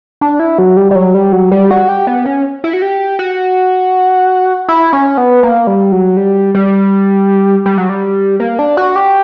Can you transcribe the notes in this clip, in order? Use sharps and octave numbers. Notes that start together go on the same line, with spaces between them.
D4
E4
F#3
G3
G3
F#3
G3
F#3
G3
F#4
G4
B3
C#4
E4
F#4
G4
F#4
E4
C#4
B3
A#3
G3
F#3
G3
G3
G3
F#3
G3
A#3
D4
F#4
G4